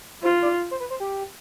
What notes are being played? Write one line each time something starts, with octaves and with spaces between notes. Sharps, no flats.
F4 C5
D5
C5
B4
C5
G4